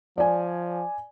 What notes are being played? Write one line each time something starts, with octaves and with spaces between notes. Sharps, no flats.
F3 D5 G#5